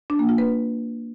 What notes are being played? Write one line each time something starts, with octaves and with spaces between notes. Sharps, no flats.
D4
A#3
F4
B4